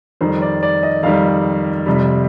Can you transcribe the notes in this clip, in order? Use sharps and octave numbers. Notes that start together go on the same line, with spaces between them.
F2 D#3 G3 C5
D5
D5
D#5
F2 D#3 G3 F5
F2 C3 G3